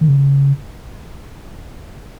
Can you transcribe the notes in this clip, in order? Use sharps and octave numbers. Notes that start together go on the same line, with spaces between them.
D#3
C#3